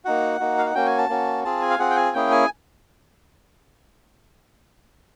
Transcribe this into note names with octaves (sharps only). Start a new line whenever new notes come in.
A#3 D#4 F#4 F#5
A#3 D#4 F#4
F5
F#5
A#3 C#4 F#4 G5
G#5
A5
A#3 C#4 F#4
C4 F4 G#4 A5
G#5
F5
C4 F4 G#4 F#5
G5
G#5
A#3 C#4 E4 G#4 G5
G#5